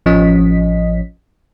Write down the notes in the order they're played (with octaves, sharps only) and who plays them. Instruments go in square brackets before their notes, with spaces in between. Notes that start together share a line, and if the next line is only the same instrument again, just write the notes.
[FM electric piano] A1 F3 C#4 D#5 B6